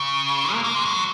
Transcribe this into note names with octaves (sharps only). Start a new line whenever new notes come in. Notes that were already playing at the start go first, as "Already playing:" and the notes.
Already playing: C#3
A#3
A#3
G#3
F#3